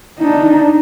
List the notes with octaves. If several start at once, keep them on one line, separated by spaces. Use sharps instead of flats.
D4 D#4